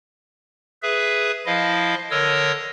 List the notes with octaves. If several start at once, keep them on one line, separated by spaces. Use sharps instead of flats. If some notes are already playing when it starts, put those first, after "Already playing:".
G#4 B4 E5
F3 E4 D#5 F5
D3 A#4 C#5 D#5 D#6 E6